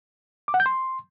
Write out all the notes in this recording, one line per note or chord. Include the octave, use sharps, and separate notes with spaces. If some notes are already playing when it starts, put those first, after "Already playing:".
D6
F#5
G6
C6